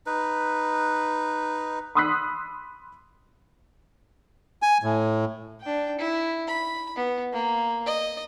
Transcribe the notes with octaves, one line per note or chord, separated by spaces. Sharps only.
D#4 B4
B5 C6 D#6 E6 F#6 B6
G#5
A2
D4 G5
E4
B5
B3
A#3
D#5